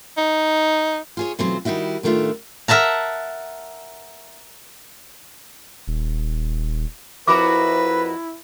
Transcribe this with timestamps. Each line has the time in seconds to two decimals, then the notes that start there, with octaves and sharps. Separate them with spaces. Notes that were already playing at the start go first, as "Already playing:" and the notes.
0.18 D#4
1.17 F4 G#4 C#5
1.39 B2 E3 F#3 A3 C4 F4
1.65 D#3 G3 D#4 E4 F#4
2.03 A2 D#3 A3 D4 F4 E5
2.68 A#4 E5 F#5 A5 A#5
5.88 D#1
7.27 F2 E4 F#4 A#4 B4 B5 D6